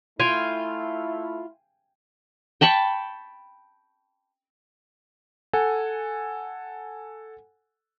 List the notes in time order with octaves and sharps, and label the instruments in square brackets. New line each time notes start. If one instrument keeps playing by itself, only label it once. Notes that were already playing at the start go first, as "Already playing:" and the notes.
[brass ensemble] A3 E4 [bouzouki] F4 [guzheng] G5 G#5
[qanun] G5 A5 B5 C#6
[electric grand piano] A4 F#5 G#5